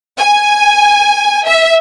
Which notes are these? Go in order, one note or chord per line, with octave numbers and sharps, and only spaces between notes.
G#5
E5